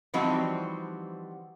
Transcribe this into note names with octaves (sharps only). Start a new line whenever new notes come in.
E3 F3 G3 C4 D#4 F#4